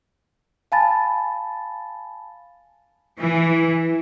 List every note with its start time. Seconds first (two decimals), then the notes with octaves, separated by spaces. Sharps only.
0.72 F5 G#5 A5 B5 A6
3.20 E3